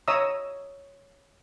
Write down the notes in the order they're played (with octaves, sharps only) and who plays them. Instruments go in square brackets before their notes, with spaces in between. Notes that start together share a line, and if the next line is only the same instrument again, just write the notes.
[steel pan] C#5 D#5 E5 A#5 D#6 E6